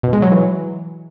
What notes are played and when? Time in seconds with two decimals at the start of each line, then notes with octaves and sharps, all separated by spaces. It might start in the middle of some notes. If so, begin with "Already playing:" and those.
0.03 B2
0.13 G#3
0.22 F#3
0.32 E3